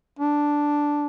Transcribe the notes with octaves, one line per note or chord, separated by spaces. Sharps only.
D4